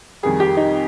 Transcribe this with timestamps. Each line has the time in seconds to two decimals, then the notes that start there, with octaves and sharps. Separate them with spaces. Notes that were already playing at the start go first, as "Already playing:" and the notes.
0.23 F2 D#3 G3 G#4
0.40 G4
0.57 D#4